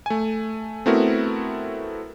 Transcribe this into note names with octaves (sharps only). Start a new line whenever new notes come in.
A3 G#5
A3 B3 C4 E4 F#4 A#4